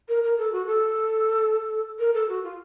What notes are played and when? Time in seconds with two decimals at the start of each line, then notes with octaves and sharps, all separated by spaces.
0.08 A#4
0.23 A#4
0.38 A4
0.52 F#4
0.66 A4
1.99 A#4
2.14 A4
2.29 F#4
2.44 F4